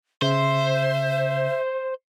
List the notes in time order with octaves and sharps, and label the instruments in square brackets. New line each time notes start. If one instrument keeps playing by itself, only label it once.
[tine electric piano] C#3 [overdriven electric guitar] C5 [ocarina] E5